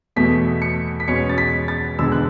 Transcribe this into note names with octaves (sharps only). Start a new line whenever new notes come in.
E2 B2 A3 B6
C#7
B6
E2 B2 G#3 C#4 C#7
A6
B6
A6
E1 E2 D3 G#3 E6
F#6